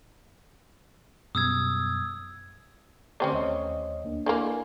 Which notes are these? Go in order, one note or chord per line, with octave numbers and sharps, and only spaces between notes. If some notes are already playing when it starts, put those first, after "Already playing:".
F#2 B2 G3 D#6 E6 G#6
D3 A3 C4 C#4 G4 D5
D#2 C#5 D#5
D2 A#3 D4
D3 E3 A#3 G#5